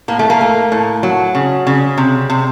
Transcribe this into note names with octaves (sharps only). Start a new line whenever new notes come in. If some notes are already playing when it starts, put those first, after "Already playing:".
A2 A#3
A3
A#3
A3
A2
F#3
C#3
C#3
C3
C3